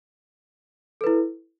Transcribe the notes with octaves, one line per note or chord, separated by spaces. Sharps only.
E4 A4 B4